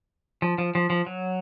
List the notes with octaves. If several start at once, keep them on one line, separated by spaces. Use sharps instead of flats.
F3
F3
F3
F3
F#3